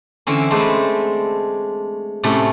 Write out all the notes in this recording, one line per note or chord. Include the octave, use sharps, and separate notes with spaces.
D3 E3 C4 C#4
G#3 A3 C4 D4 B4 C5
A2 C3 A3 C#4